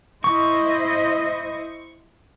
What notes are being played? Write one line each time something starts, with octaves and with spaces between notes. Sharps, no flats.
E4 C5 D#5 C#6